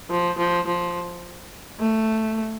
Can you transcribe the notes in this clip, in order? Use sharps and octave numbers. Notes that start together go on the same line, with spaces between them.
F3
F3
F3
A3